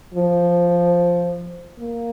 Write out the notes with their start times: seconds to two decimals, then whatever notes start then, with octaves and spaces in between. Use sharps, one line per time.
0.15 F3
1.80 A#3